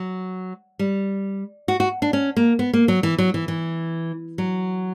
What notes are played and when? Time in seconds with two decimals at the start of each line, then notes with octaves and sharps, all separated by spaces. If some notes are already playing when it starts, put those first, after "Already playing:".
Already playing: F#3
0.79 G3
1.68 F#4
1.80 F#4
2.02 D4
2.13 C#4
2.37 A#3
2.59 B3
2.73 A#3
2.88 F#3
3.03 E3
3.18 F#3
3.34 E3
3.48 E3
4.38 F#3